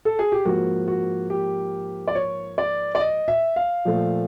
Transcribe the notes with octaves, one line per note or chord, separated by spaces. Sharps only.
A4
G#4
G4
G#2 F3 A#3 F#4
F#4
G4
D5
C#5
D5
D5
D#5
E5
F5
A#2 F3 A3